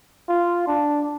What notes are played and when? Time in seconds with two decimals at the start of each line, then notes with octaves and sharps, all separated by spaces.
0.29 F4
0.67 D4